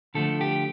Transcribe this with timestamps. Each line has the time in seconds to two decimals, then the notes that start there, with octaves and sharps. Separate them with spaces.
0.15 D3 F3 A3 A4
0.41 G4